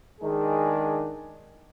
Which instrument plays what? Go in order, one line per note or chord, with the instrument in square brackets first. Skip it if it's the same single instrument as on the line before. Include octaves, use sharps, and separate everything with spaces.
[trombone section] D#3 G#3 D4 G#4